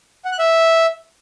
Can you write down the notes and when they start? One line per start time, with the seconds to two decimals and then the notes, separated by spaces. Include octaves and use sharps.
0.25 F#5
0.32 F#6
0.39 E5